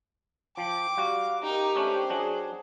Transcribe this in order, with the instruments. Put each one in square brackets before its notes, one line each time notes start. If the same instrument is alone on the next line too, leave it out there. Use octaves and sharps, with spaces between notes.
[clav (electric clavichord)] F3 [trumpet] G5 [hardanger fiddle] D6
[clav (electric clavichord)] G3 F#4 [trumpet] F5
[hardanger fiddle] D#4 A#4 [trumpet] G4
[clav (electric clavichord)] A3 C#4 D4 [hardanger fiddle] C5
[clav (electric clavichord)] F#3 D4 [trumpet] G#4